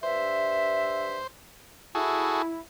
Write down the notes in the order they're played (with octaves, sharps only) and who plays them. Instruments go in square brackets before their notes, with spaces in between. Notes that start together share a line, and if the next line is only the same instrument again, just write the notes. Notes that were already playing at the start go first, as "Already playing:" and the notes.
[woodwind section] G2 E5 [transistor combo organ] C5
[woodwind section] E4 [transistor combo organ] F#4 G#4 A4